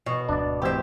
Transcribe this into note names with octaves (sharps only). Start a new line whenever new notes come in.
B2 C#5
D1 G#2 D4 D5
A1 C4 G4 C5 E5